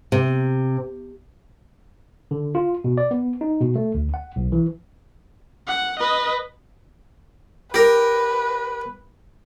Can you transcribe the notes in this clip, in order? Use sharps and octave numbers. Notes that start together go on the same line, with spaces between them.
C3
D3
F4
B2
D5
B3
D#4
B2
A3
D2
F#5
B1
E3
F#5
B4 D#5
G4 A#4 B4